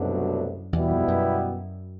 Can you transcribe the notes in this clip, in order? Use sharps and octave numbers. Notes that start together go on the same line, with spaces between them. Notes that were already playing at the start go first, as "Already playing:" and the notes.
Already playing: C2 F#2 B2 F#3 A3 D4
E2 B2 G3 B3 E4 G4
F2
F#2